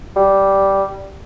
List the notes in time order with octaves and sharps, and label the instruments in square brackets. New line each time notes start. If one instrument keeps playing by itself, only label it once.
[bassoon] G3